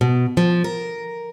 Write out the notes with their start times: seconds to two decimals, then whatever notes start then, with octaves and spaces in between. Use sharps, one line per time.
0.01 B2
0.37 F3
0.64 A#4